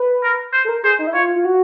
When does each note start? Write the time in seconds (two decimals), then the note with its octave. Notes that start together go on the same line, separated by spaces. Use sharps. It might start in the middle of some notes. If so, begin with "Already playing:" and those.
Already playing: B4
0.23 A#4
0.53 C5
0.65 A4
0.69 A#4
0.84 G#4 C5
0.99 D#4
1.07 E4
1.14 F4 C#5
1.36 F4
1.45 F#4